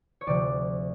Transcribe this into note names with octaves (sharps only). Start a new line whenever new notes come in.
C#5
D2 C3 F3 D5